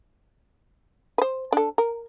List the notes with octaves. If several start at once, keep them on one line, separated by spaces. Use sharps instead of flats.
B4 C5
D4 A4
A#4